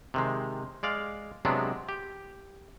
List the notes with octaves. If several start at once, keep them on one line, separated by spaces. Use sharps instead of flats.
C3 D#3 G#3
G#3 D5 F5
C3 F#3 G#3 B3 D4
G4